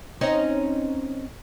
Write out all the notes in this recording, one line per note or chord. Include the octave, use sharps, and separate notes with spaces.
C4 C#4 D#4